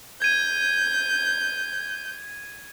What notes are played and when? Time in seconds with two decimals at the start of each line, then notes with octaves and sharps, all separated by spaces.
0.22 G6 G#6 D#7